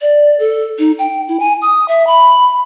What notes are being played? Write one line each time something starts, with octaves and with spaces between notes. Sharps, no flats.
D5
A4
D#4
G5
E4
G#5
D#6
E5
B5